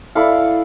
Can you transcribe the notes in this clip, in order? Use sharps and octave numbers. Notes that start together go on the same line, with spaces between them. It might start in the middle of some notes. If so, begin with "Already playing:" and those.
E4 A4 D5 F5